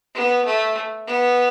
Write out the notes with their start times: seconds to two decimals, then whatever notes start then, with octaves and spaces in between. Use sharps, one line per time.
0.15 B3
0.45 A3
1.07 B3